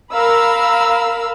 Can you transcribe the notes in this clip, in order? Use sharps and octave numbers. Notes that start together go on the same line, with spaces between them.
A#4 F5 B5 E6